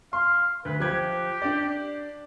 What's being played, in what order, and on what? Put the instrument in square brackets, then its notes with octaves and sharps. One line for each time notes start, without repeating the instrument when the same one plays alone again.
[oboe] F5 [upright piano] C6
[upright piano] D2 [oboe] B4
[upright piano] F3 F#6 G#6 [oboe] G4
[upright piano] D4 D5